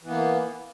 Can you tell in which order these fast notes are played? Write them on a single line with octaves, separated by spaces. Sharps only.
E3 B3 A#3